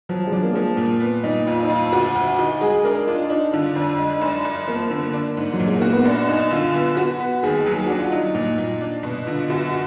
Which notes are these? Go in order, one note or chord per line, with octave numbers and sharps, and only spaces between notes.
F3 F#3
G#3
F#3 D4
A#3
F3 G#3
A#3
A#2
B3
A#2 D#4
F2 F4
D#4
F2 F4
D2 F#4
D2
D#4 F#4
G#3 G#4
D4 A#4
D4 F4
F4
D4 D#4
D3 F4
F2 D4
G#3
D#4
F#2 D4
F#2
F3 A#3
D3 A#3
D4
G#2
F#3
A#2
G#3
A#3 F#4
B3
F#2 D4
F#2 D#4
D3 F4
B3
B3 F#4
B3
D#2 G#4
F#3
G#4
D4 F#4
F4
F#3 D#4
A#2
A#2
D4
B2
D3 F4
F#2 F#4
F#4